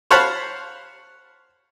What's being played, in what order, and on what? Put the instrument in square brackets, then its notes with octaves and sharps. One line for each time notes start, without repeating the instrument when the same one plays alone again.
[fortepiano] C5 C#5 F5 F#5 A5 B5